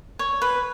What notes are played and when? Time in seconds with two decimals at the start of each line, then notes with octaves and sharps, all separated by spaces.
0.19 C#5
0.42 B4